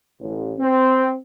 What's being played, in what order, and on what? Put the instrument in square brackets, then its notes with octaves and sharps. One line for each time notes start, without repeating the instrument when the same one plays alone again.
[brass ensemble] A1
C4